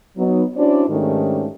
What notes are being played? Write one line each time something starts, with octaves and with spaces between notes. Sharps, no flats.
F#3 B3 D#4
C#4 D4 E4 F#4 C5 D5
G#2 D#3 A3 C#4 D4 G4